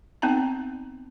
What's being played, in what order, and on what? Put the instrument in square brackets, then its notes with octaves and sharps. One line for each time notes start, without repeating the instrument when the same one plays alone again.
[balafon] B3 C4 D#4 A5 A#5